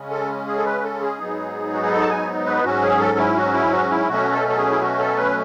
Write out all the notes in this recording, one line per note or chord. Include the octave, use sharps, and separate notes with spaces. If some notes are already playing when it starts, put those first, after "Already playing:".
Already playing: C#3 G#3 C#4
A4
G#4
A4
B4
A4
G#4
G#2 F#3 B3 D#4
F#4
G#4
A4
A5
G#5
B4
G#2 F#3 C#4 F#4
G#4
A4
E4
F#4
E4
F#4
E4
B2 F#3 A3 C#4 F#4
A4
A4
G#4
E4
F#4
A4
B4